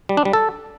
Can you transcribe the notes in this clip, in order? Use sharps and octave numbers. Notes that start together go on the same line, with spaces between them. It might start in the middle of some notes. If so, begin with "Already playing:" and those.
G3
D4
G3
A4